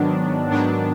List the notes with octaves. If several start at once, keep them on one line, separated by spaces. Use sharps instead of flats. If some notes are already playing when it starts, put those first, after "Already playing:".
Already playing: G#2 D#3 F#3 B3 D4
G#2 D#3 F#3 B3 D4